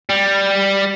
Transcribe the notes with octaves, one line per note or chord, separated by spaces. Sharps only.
G3